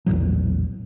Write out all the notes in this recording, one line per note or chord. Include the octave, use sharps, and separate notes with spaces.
A#1 E2 A2 F#3